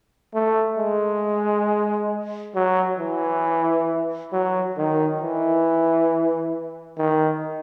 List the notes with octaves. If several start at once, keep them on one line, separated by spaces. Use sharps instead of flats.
A3
G#3
F#3
E3
F#3
D#3
E3
D#3